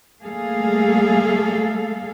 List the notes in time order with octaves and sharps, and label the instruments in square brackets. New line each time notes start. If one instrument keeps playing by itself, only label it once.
[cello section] G3 A3 A#3 G#4 A4 F5